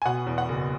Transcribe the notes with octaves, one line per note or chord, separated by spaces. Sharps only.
G#5
B2 F#5
E2
F#5
F#1